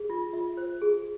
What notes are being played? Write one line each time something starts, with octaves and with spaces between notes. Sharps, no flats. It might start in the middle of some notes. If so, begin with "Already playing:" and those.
Already playing: G#4
F4
F4 E5
C5
G#4